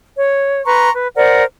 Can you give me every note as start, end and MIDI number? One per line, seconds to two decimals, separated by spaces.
0.17 0.63 73
0.65 0.90 71
0.65 0.90 82
0.65 0.90 84
0.65 0.90 85
0.94 1.07 71
1.15 1.42 70
1.15 1.42 72
1.15 1.42 74
1.15 1.42 78